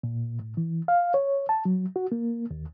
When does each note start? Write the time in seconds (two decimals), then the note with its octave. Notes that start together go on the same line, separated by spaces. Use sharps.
0.03 A#2
0.40 A2
0.57 E3
0.88 F5
1.14 C#5
1.49 A5
1.65 F#3
1.96 F#4
2.12 A#3
2.51 D#2